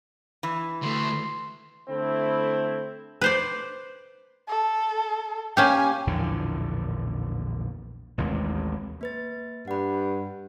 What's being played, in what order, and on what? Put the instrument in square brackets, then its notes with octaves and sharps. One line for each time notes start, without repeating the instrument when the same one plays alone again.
[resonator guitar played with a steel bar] E3
[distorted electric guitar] D3 A3 [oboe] C6
[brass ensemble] D3 A3 C4 E4
[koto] B4 C5 D5
[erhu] A4
[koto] A#3 C#4 G4 [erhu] G#5
[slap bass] A#1 E2 A2 D3
A1 D#2 C3 G#3
[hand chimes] A#3 B4 A6
[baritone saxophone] G2 [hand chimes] F#5 B5